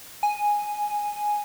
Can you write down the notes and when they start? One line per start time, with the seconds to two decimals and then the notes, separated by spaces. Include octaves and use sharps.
0.23 G#5